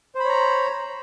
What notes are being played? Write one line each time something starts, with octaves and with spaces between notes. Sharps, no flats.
C5 C#5 A#5 B5